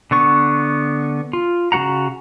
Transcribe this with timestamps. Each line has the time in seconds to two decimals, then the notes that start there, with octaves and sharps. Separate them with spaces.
0.11 D3 B3 C#6
1.33 F4
1.72 C#3 C4 F#4 F#5 A#5